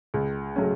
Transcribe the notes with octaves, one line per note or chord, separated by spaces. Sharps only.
C#2
C#3 F#3 A3 C#4